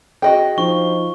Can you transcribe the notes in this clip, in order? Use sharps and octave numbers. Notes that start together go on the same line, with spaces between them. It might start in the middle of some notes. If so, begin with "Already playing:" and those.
F#4 G#4 D#5 G5
F3 D#4 C#6